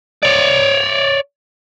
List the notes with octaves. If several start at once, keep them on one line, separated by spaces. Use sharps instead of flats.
C#5 D5